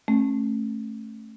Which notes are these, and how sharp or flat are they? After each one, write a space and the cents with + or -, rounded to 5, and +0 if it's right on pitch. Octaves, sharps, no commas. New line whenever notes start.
A3 +0 C#4 -30